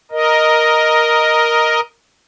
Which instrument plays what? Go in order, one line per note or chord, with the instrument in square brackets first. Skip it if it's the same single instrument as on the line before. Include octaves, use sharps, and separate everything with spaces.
[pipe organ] A#4 D#5